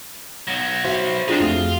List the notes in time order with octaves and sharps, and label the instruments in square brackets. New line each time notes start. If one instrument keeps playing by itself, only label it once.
[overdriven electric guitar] B1 F#3
[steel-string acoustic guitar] F#4 E5 F5 [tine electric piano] C5
[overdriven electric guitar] C4 D#4 [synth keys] D4 F4 G#4
[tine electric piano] F2 A3 [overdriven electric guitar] F4 [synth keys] G#4